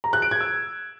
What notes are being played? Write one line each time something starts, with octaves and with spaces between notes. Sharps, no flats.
A#5
F#6
D7
G#6
E6